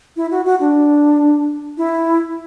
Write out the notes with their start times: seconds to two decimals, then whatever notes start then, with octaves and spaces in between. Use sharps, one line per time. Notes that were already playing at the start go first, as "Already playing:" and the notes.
0.16 E4
0.31 F#4
0.45 F#4
0.60 D4
1.77 E4